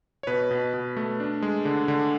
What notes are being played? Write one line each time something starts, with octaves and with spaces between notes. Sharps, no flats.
C#5
B2 B4
B2
B2
A3
D4
G#3
D3
D3